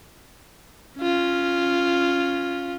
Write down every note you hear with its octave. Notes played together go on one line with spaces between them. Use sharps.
C#4 F4